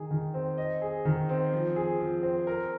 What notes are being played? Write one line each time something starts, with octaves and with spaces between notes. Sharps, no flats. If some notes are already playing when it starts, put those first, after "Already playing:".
Already playing: D#3 G#4
D#3
C4
D#5
G#4
D#3
C4
F3
G#4
F3
C4
A#4